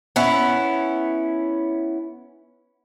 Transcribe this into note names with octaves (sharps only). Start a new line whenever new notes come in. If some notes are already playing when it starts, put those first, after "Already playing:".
B3 C#4 E4